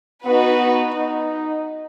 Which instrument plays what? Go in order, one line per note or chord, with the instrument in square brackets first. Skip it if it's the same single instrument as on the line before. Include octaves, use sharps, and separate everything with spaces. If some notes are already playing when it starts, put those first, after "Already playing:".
[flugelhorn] B3 [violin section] D#4 F#4 B4
[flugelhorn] D#4